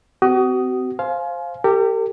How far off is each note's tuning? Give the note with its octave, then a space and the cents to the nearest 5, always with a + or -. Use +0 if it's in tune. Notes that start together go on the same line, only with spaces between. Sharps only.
C4 -30 F#4 +35 D#6 +0
C5 +10 F5 +0 G#5 +30
G4 +0 A#4 -45